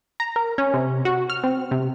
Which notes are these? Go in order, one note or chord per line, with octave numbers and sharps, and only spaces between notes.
A#5
A#4
C#4
C3
F#4
F6
C4
C3